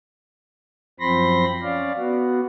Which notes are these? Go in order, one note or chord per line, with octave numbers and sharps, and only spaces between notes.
F#2 F3 C4 B5 C6 A#6
C#4 D5 F5
B3 F#4